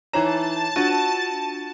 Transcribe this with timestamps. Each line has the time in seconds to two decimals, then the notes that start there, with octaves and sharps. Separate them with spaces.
0.13 E3 D#4 C#5 A5 A#5 E7
0.76 D4 F4 F#4 D#7